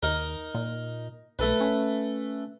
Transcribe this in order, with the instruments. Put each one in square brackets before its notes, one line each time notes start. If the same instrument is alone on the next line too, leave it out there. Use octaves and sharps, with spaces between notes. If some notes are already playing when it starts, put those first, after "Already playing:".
[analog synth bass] D#2 [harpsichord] D#4 A#4
[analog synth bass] A#2
[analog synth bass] B1 [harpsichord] A3 A4 B4
[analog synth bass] C#4